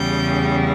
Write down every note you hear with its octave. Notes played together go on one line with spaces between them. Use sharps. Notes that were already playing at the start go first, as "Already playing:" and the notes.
Already playing: E2 C#3 G3 G5